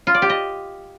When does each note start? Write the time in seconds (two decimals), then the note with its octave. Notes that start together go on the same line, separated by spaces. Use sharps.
0.07 F4
0.14 D5
0.22 G4
0.30 D#5